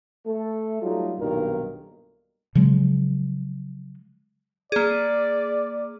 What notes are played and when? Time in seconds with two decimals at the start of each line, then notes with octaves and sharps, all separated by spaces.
0.26 A3 A4
0.82 F#3 G3 A3 D#4 F4
1.18 B1 G2 A#2 D#3 A#4
2.55 C#3 F3 F#3 G#3
4.72 A#3 G#4 D5